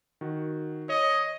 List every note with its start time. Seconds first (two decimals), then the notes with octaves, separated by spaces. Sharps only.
0.21 D#3 F#4
0.89 C#5 D#5